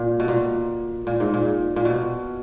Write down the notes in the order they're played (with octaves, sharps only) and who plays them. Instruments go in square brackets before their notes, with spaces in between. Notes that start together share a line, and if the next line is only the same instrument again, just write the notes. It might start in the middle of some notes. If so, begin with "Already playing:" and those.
Already playing: [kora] A#2
B2
A#2
A#2
G#2
A#2
A#2
B2